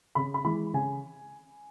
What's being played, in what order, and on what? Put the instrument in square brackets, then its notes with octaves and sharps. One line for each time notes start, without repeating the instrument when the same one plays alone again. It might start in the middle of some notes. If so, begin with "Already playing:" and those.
[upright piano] C#3 B5
B5
E3 G#3 B5
C#3 G#5